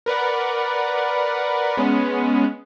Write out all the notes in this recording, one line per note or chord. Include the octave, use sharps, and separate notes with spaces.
A#4 B4 D5 F#5
G#3 B3 C#4